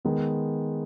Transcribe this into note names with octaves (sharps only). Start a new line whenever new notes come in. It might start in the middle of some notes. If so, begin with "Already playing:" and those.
D#3 G#3 B3